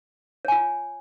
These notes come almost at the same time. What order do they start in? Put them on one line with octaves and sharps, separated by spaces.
C#5 G#5 F4